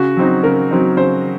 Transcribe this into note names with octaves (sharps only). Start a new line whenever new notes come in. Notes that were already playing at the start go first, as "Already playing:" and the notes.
Already playing: C#3 F#4
F#3 C4 D#4
C#3 A#4
F#3 C4 D#4
C#3 C5